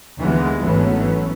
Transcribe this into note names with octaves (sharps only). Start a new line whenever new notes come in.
D#2 D3 E3 G#3 B3
G#1 E3 F#3 A3 B3 C#4